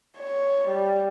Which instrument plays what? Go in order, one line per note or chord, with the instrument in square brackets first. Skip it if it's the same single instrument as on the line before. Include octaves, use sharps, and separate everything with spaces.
[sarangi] C#5
G3